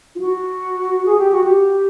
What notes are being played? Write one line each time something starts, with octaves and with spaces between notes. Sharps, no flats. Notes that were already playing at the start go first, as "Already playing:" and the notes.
F4
F#4
G#4
G4
F#4
G4